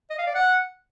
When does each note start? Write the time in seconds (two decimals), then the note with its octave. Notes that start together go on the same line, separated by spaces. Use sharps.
0.10 D#5
0.18 F5
0.27 D5
0.35 F#5